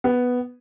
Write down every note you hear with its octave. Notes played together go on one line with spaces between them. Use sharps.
B3